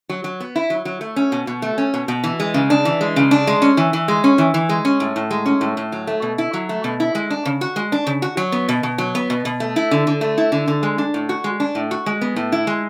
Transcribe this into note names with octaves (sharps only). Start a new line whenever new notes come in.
F#3
F#3
B3
E4
F#3
F#3
A3
C#4
B2
B2
A3
C#4
B2
B2
E3
G#3
C#3
D4
E3
G#3
C#3
D4
G#3
C#4
E3
E3
G#3
C#4
E3
E3
G#3
C#4
A2
A2
G#3
C#4
A2
A2
F#3
A3
B2
E4
F#3
A3
B2
E4
G#3
D4
C#3
F#4
G#3
D4
C#3
F#4
F#3
B3
B2
B2
F#3
B3
B2
B2
A3
E4
D3
D3
A3
E4
D3
D3
G#3
D4
A2
F#4
G#3
D4
A2
F#4
G#3
B3
A2
E4
G#3